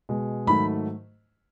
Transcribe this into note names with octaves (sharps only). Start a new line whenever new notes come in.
B2 G#3
G#2 D#3 F#3 A3 B5